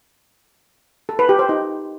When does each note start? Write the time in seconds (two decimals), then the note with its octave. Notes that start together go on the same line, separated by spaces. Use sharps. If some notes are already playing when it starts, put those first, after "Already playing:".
1.09 A4
1.19 B4
1.29 G4
1.39 C5
1.49 D#4